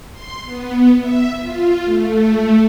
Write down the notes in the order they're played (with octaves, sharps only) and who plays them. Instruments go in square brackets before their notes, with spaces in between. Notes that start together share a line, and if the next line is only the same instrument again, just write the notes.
[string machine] C6
B3
E5
F4
A3